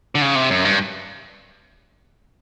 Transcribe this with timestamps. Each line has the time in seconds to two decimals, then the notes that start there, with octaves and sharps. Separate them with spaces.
0.15 D3
0.22 C#3
0.35 C3
0.50 F#2
0.65 G2